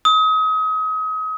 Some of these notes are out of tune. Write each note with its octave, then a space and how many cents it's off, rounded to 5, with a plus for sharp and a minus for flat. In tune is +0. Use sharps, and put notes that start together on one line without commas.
D#6 +35